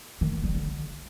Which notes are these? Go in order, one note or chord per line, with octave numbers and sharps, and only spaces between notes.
D#3
A#3
G3
D3